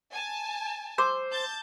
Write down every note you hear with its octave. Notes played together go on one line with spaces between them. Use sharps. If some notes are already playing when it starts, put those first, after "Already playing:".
G#5 A5
C5 D6 E6
A5 G6 A6